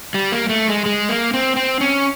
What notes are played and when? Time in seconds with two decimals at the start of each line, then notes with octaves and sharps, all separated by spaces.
0.14 G3
0.32 A#3
0.49 A3
0.68 G#3
0.86 G#3
1.09 A#3
1.34 C4
1.57 C4
1.81 C#4